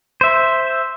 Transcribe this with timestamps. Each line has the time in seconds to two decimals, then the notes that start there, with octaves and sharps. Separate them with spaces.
0.21 C5 E5